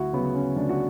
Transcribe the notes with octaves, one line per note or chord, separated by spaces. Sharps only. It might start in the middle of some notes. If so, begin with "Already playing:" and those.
Already playing: D2 E4 F#4
C#3 F#3 B3
C#4
D2 D4
F#4